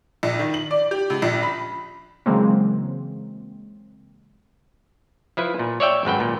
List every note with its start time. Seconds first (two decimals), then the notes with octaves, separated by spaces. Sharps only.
0.23 A#1
0.39 D#3
0.54 F#7
0.71 D5
0.91 G4
1.10 C#2
1.22 A#1
1.43 B5
2.26 C#3 E3 F#3 G#3 A#3 C4
5.37 F3 E4 B4
5.59 A#2
5.80 C#5 D5 E5 G5
6.05 G#1 F#2 B4 G5
6.20 A#2